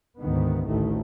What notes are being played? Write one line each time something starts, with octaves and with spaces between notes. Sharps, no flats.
D2 G#2 D#3 B3
A1 D2 A2 D#3 A3